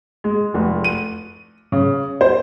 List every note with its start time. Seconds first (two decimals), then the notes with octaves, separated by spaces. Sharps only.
0.24 G#3
0.54 F1
0.84 D#7
1.72 C#3
2.21 C5